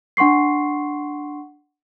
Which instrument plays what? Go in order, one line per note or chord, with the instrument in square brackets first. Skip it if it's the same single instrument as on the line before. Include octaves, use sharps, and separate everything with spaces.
[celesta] D4 F#5 C6 C#6 C7